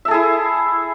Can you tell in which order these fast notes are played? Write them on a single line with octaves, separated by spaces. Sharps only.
E5 A4 G#4 E4